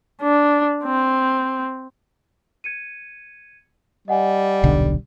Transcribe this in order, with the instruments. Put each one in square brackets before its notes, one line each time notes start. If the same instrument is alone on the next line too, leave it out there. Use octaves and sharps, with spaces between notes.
[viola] D4
C4
[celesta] G#6 C#7 D#7
[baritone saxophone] G3 [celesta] D#5 F#5 G#5
[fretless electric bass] D#1 B1 D3